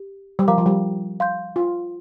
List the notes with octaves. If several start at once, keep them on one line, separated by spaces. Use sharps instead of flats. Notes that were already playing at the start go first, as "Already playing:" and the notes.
Already playing: G4
G3
F3 A#4 F5 A#5 D6
F3
G3
F5 C6 G6
F4